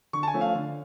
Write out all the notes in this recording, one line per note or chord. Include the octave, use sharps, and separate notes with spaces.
D3 C#6
A5
G#5
F3 A3 C#4
F5
D3